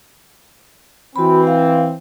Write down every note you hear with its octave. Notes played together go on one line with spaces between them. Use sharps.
E3 C4 F#4 B5
F5